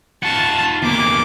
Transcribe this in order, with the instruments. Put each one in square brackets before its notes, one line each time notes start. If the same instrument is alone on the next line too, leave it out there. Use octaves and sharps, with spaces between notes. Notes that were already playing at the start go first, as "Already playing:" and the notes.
[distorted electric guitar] F4 F#5 [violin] A5
[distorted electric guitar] E2 A#3 [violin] D6